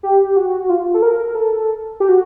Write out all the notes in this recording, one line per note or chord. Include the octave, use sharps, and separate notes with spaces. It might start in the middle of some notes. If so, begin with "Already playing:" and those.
G4
F#4
F4
A4
A#4
A4
G4
F#4